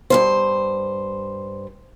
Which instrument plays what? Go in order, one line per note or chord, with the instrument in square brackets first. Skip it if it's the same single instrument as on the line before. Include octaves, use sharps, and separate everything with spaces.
[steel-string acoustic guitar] G2 A#2 C5